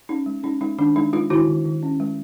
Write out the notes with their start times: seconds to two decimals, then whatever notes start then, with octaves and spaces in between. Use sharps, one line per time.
0.09 C#4 D#4
0.26 G#3
0.43 C#4 D#4
0.61 G#3 D#4
0.79 D#3 D4
0.96 G#3 D#4
1.13 G#3 D#4 F4
1.30 D#3 E4 F#4
1.48 D#3
1.65 D#3
1.83 C#4
2.00 G#3